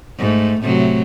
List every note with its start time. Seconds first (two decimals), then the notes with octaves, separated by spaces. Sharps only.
0.18 G#2 A3
0.61 A2 C3 F#3